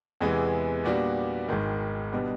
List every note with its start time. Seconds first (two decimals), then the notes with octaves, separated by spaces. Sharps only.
0.20 E2 C3 E3 G#3 B3
0.84 A#2 G3 B3 D4 F#4
1.48 G#1 G#2 D#3
2.12 B2 G3 B3 D4